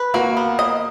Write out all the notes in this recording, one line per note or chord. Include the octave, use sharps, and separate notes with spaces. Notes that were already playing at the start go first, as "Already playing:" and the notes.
Already playing: B4
A#3 F#4
B3
D#5